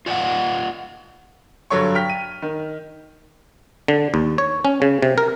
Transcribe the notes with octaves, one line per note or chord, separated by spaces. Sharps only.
F4 D5 D#5 F5 F#5
G2 D3 F#3 C#5 C#6
G5 F6 B6
D#7
D#3
D3
D#2
C#5
C#4
C#3
C3
A#4